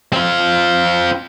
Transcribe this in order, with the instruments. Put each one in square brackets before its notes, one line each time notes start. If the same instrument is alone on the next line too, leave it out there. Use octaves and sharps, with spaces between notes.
[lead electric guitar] C4 F4